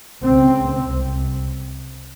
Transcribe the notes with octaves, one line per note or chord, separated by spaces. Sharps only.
C#2 C#3 C4
C2 C3